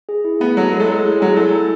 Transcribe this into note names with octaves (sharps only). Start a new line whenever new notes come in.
G#4
E4
A3 B3
F#3 A4
G#3 C#5
A3
G#3 C#5
E4
F#3 G#5
G#3
A3 E4
E4